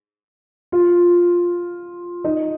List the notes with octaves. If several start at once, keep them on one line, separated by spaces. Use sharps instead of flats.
F4
D#4